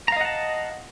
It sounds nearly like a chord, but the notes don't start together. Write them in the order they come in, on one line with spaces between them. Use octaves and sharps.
A#5 F5 D#5 F#5 A5